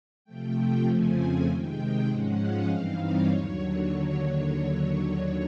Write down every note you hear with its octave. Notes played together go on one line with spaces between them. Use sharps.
C3 F3 A3 G5
F2 C#3 F3 A3 C4 G#5
C3 D#3 G#3 G5
G#2 F3 G#3 C#4 F#5
F5
G2 E3 G3 C4 D#4
C#5
D#2 D3 F#3